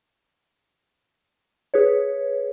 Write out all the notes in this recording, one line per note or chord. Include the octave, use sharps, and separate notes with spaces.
G#4 B4 C#5